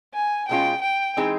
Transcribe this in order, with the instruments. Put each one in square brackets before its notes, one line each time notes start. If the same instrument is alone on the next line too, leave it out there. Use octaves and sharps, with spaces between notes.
[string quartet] G#5
[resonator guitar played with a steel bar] B2 G#3 C#4 F4 [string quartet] G5
[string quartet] G5
[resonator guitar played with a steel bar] E3 G#3 C4 D#4 G#4